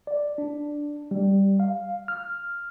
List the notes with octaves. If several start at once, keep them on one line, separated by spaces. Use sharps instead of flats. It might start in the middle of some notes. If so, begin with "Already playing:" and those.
D5
D4
G3
F5
F6